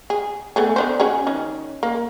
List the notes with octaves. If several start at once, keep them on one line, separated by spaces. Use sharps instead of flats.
G#4
A3 B3 G#4
B3 D4 C5
C#4 F#4 G#4
D#3 C#4
A#3